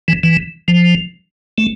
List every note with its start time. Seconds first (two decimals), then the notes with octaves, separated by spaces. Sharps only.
0.08 E3
0.23 E3
0.68 F3
1.58 A3